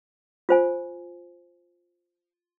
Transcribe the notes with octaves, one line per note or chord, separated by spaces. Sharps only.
F4 C5 G#5